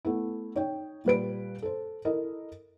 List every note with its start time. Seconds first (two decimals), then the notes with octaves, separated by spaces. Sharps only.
0.05 A3 B3 E4
0.55 D#4 C#5 G5
1.05 A#2 G3 B4 D7
1.62 A4 C5
2.05 E4 A4 A#4 D#5